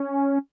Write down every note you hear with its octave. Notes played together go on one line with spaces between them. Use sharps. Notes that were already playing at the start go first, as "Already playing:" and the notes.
Already playing: C#4